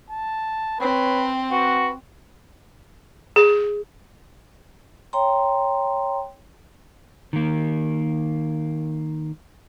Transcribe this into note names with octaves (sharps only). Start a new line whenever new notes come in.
A5
C4 B4 C#5
F#4 B4
G#4
C#5 G5 A#5 C6
D#3 A#3